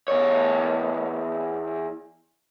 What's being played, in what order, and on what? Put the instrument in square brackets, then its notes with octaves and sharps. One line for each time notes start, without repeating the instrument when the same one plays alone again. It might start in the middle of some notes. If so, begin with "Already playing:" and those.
[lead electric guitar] E2 C#5